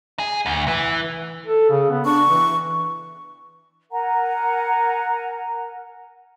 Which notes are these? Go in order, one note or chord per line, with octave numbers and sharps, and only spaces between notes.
G#4
D2
E3
A4
C#3
B3
D4 C#6
E3
A#4 F#5 G#5 A#5